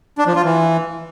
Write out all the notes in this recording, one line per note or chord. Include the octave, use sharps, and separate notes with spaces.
D4
F3
F4
E3